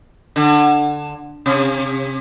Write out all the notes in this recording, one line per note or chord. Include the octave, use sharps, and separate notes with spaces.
D3
C3